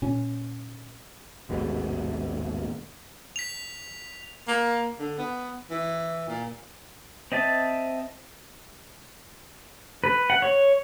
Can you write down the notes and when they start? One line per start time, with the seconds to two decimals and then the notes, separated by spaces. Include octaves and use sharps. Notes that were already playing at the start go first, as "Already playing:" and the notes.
0.02 A#2 C#4
1.49 A1 D#2 G#2 B2
3.36 B6 F7
4.48 A#3
4.99 D3
5.18 B3
5.70 E3
6.28 A#2
7.32 C4 D#5 E5 A5
10.04 B4
10.30 F#5
10.42 C#5